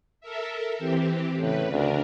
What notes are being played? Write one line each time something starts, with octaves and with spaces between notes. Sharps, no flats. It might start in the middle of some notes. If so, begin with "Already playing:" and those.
A4 A#4 E5
E3 C4 G4
A2 C#3 B4
D2 D4 A#4